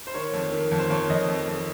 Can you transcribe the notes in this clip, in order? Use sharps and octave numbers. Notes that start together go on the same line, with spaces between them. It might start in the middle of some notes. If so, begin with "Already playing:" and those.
C5
D#3 C#5
F2
D#3
F2
C5
F2 C#5
F2 D#5
F2
F2